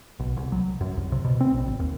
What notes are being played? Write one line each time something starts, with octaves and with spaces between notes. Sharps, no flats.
B1
C2
F#3
F#2
C2
C3
B2
C4
A#1
G#1
D#2